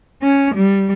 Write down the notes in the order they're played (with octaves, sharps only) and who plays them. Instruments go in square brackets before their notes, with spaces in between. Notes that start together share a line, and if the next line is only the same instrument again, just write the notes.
[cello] C#4
G3